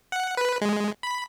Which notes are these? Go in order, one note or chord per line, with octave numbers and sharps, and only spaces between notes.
F#5
B4
G#3
B5